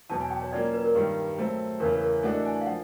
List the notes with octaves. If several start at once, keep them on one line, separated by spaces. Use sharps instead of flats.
E2 B2 F#3 A5
G#5
G5
C#5
F#3 A#3 C#4 F4 D5
B4
A#4
G2 D#3 G3
F#3 A3 C4
E2 C#3 E3 A#4
B4
A#4
E3 A3 D4 F#4 A4
D#5
G#5
G#5
F5
F3 F#5